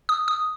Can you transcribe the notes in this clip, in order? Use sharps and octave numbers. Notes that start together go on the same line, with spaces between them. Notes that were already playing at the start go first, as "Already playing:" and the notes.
D#6
D#6